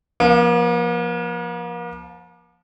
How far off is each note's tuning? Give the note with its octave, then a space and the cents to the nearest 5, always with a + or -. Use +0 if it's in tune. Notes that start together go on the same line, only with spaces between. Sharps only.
F3 +0 A#3 +45